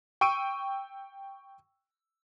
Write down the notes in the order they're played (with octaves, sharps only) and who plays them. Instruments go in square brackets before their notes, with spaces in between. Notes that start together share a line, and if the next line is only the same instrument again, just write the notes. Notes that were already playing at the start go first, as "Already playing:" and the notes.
[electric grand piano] G5 C#6 E6 D7 D#7